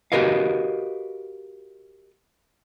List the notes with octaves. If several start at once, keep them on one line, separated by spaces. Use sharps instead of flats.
F#4 G4 A#4 B4 D#5 F5